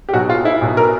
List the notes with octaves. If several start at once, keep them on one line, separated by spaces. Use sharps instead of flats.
G4
B1 B2 F#3 F#4
F4
E4
B1 B2 F#3
A#4